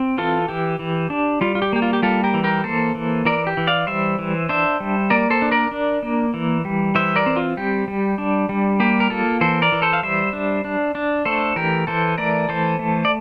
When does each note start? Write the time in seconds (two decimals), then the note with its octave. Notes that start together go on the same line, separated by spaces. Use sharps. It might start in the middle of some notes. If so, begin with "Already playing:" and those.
Already playing: C4
0.18 E3 F4 A4
0.48 E3 G4
0.79 E3
1.10 D4
1.41 G3 F4
1.55 F4
1.62 G4
1.73 A#3 G4
1.82 F4
1.93 G4
2.03 G3 F4 A4
2.24 G4 A#4
2.34 E3
2.44 G4 A#4
2.64 A#3 A4 C5
2.95 E3
3.25 E3 A#4 D5
3.47 G4
3.57 E3
3.67 D5 F5
3.87 G3 C5 E5
4.19 E3
4.49 D4 C5 E5
4.80 G3
5.10 A#3 A#4 D5
5.30 A4 C5
5.42 D4
5.52 A#4 D5
5.71 D4
6.03 A#3
6.34 E3
6.65 G3
6.95 E3 C5 E5
7.16 A#4 D5
7.26 C4
7.36 F4
7.57 G3 G4
7.88 G3
8.18 D4
8.49 G3
8.80 A#3 G4
9.00 A#4
9.10 A#3 F4 A4
9.41 E3 A4 C5
9.62 A#4 D5
9.72 E3
9.82 A4 C5
9.93 F5
10.03 G3 C5 E5
10.33 D4
10.65 D4
10.95 D4
11.25 A3 A4 C5
11.56 E3 G4 A#4
11.87 E3 A4 C5
12.18 A3 A#4 D5
12.49 E3 A4 C5
12.79 A3
13.05 D5